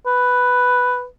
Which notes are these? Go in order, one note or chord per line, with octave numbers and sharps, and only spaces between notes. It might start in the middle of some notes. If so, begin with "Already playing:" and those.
B4